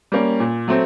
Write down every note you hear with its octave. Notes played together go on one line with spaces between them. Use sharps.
G3 A#3 C#4
A#2
F#3 A3 C4